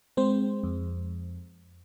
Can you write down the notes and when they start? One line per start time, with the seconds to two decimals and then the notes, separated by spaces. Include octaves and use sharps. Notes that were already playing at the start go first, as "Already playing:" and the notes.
0.17 G#3 C4 C5
0.63 F2